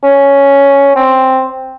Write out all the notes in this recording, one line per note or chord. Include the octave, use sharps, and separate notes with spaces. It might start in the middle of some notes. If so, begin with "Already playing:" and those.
C#4
C4